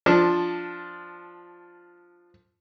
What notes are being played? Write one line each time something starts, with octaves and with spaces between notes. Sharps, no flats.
F3 D4